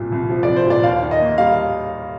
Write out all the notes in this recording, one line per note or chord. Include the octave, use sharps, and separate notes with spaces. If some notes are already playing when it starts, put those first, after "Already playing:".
Already playing: C2 A#2
C2
F3
D5
C2
C5
A#2 D5
D#2 F5
D#3
D#5
A#3
G3 F5